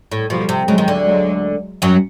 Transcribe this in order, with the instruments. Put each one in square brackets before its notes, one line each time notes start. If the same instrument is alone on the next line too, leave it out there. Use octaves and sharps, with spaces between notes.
[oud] A2
[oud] B2 [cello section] F3 G3
[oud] C3
[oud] C#3 [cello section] F#3 G#3
[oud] D#3
D2 D3
[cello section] F#3 G#3
[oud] F#2 F#3